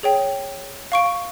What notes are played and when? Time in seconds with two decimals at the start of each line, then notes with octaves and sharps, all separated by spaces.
0.03 G#4 C#5 G5
0.92 F5 C#6 D7